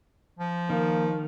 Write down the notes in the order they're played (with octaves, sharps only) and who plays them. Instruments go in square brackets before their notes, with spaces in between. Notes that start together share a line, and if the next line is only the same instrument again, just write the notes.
[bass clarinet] F3
[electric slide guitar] D#3 [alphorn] A#3